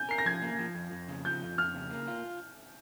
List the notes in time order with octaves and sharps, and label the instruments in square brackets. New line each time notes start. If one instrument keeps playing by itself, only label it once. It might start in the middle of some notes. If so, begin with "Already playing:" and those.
Already playing: [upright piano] G#5 G6
[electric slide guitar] A#4 [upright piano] C7
[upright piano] A#6
[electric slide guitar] F3 [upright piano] G#6
[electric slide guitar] A#3
F3
F2
F2
C#3
[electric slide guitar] F3 [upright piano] G6
[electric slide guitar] F2
[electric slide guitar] F2 [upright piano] F6
[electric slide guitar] C#3
A#3
F4